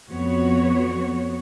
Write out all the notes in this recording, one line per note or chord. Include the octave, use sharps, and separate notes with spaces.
F2 B3 F#4 C#5